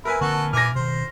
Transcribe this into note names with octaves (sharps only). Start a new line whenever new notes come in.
E4 A#4 B4 G#5
D3 A#3 C4 F#4 A4
A#2 E3 G#5 D6 F6 A#6
B2 D#3 C5